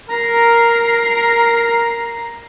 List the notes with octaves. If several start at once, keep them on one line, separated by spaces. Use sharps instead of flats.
A#4 A#5 C7